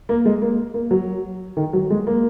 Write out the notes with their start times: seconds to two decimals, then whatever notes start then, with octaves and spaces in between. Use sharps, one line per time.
0.09 A#3
0.26 G#3
0.42 A#3
0.74 A#3
0.91 F#3
1.57 D#3
1.73 F#3
1.90 G#3
2.07 A#3